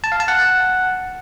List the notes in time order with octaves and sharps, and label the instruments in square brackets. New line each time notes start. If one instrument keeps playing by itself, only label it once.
[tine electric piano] A5
F5
A5
F#5